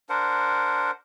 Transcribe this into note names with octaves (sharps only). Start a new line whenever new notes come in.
D4 A#4 C5 F#5